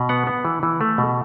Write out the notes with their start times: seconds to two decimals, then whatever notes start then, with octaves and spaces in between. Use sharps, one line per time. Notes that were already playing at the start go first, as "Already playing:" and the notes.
Already playing: B2
0.09 B3 F#5
0.27 B3
0.45 E3
0.63 E3
0.81 A3
0.98 B2